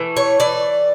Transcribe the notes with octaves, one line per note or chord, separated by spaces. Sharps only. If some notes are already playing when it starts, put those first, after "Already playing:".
Already playing: E3 A3
C#5
E3 D5